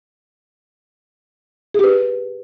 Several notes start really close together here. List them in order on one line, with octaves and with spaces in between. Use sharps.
G#4 G4 B4